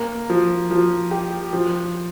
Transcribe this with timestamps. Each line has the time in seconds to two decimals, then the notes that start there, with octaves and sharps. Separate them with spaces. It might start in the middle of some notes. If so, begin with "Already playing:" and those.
Already playing: A#3
0.30 F3
0.71 F3
1.11 G4
1.53 F3